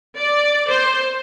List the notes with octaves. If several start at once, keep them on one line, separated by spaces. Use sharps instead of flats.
D5
C5